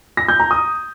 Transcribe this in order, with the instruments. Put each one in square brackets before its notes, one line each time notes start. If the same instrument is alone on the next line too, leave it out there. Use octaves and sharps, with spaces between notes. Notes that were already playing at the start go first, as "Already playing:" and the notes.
[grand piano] A#6
G6
A#5
D#6